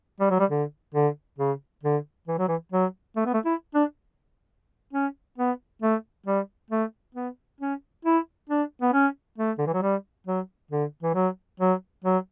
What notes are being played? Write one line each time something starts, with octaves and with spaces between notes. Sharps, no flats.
G3
F#3
G3
D3
D3
C#3
D3
E3
F#3
E3
F#3
A3
B3
A3
E4
D4
C#4
B3
A3
G3
A3
B3
C#4
E4
D4
B3
C#4
A3
D3
E3
F#3
G3
F#3
D3
E3
F#3
F#3
F#3